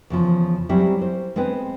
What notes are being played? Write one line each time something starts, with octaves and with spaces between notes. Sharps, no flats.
E2 C#3 F3
F#3 G3 C4 C#4 E4
C5
G#3 B3 C4 B4